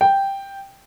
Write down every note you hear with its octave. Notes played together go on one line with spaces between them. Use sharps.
G5